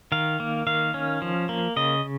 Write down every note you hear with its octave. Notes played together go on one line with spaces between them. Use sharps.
D#3 F5
A#3
D#3 F5
C#4
F3
A#3
C#3 D#5